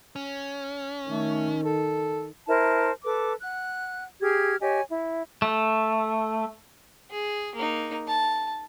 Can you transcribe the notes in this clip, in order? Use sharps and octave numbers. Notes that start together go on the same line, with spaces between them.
C#4
D#3 A3
A4
E4 A#4 C5 A5
A4 B4 D6
F#5 F#6
G4 G#4 F6 G#6
G4 C#5 D#5 G#5
E4
A3
G#4
A#3 D#4
A5